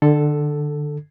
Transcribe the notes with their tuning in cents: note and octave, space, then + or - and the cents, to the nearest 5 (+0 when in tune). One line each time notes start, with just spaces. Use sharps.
D3 +25 A4 +0